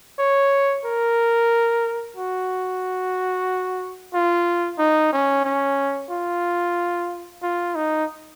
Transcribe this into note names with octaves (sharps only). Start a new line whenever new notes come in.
C#5
A#4
F#4
F4
D#4
C#4
C#4
F4
F4
D#4